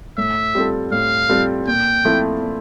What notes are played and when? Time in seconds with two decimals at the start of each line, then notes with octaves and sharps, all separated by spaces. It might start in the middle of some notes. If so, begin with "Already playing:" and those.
0.17 A2 E5
0.55 G3 C4 F4 A4
0.92 A2 F5
1.29 G3 C4 F4 A4
1.67 A#2 G5
2.05 F3 A3 C4 E4
2.42 A#2